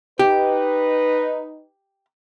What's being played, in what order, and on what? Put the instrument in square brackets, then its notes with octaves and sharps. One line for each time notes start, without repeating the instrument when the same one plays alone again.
[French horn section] D#4 B4 [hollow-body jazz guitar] G4